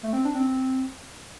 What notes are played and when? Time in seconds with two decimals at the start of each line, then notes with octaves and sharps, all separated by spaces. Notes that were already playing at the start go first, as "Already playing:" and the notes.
0.03 A3
0.13 C4
0.25 D4
0.35 C4